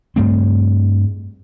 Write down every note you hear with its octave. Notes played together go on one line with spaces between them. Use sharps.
G2 A3 C4